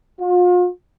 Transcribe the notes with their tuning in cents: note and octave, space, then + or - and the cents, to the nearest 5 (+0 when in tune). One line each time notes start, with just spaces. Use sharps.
F4 +40